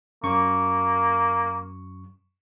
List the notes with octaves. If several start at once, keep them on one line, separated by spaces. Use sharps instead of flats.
F#2 A#3 C#6